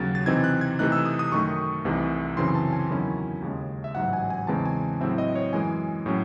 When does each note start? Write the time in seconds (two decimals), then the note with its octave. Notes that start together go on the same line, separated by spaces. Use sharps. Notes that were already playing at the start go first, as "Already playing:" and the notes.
Already playing: D#2 C#3 F#3 A6
0.15 A6
0.26 C3 E3 C4 D#4 G#6
0.44 F#6
0.61 G#6
0.79 C3 E3 A3 D#4 F#6
0.92 E6
1.05 D#6
1.19 D#6
1.32 F#2 D#3 A3 C#6
1.85 C2 C3 E3 A3 D#4
2.37 F#2 C#3 E3 C4 C6
2.55 A5
2.73 G#5
2.90 E2 D#3 F#3 C#4 E4
3.42 D#2 C#3 G#3
3.84 E5
3.95 A1 G#2 F#3 F#5
4.13 G#5
4.30 G#5
4.47 E2 C#3 E3 G#3 C4 A5
4.65 G#5
5.00 A2 F#3 C4 E4 E5
5.18 D#5
5.35 C#5
5.53 F#2 E3 G#3 G#5
6.06 A2 F#3 C#4